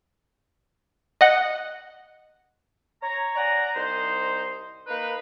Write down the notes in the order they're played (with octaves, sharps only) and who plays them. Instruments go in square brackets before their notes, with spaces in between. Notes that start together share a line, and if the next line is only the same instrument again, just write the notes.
[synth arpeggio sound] D#5 F#5 F#6
[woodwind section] C#5 A#5
D5 F#5 G#5 A#5
C2 D#4 C5
A#3 D#4 B4